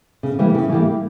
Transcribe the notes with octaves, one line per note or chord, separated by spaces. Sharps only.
C#3
E3 G3 A#3
C#3
E3 G3 A#3